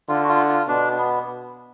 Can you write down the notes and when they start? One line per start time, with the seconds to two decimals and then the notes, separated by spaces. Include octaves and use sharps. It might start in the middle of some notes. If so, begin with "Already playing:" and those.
0.09 D3 F4
0.24 F#4
0.29 F4
0.49 F4
0.68 B2 D4
0.98 B3